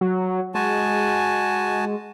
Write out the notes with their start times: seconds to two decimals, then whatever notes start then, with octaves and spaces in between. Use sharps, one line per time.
0.01 F#3
0.55 G#3 F#4 G#5 A5